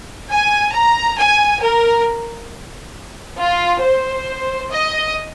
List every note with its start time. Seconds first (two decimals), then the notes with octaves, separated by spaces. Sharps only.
0.30 G#5
0.74 A#5
1.18 G#5
1.62 A#4
3.39 F4
3.83 C5
4.73 D#5